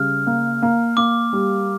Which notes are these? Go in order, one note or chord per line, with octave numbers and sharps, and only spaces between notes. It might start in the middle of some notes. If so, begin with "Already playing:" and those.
Already playing: C#3 G3 F6
A#3
A#3
A#3 D6
G3